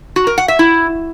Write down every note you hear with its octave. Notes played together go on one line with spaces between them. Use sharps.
F#4
A#4
F#5
E5
E4